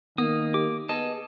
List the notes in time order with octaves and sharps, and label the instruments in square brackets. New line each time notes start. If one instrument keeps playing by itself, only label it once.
[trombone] D#3 [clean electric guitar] A#3 [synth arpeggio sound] B3 [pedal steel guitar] D#6
[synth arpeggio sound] G4 [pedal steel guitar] D6
[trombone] B3 [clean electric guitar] G#4 A5 [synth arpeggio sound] B4 [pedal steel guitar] D#5